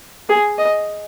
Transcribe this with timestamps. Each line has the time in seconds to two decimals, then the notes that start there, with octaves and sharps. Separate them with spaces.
0.29 G#4
0.58 D#5